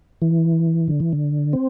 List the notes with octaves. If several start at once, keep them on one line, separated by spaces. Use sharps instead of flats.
E3
D3
E3
D3
C4